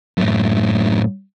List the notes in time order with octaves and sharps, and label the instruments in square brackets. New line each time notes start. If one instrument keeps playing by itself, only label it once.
[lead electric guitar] F#2 A2